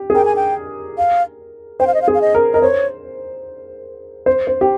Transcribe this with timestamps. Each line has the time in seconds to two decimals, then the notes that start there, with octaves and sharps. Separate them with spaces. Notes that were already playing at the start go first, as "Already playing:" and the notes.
Already playing: G4
0.10 G#4
0.15 A#4 G5
0.25 G#5
0.36 G5
0.98 F5
1.80 C5 G5
1.87 F5
1.94 D#5
2.02 F5
2.08 G#4
2.15 F5
2.21 D#5
2.35 A#4
2.53 A#4 D#5
2.62 C5 C#5
4.26 C5
4.47 C5
4.61 G4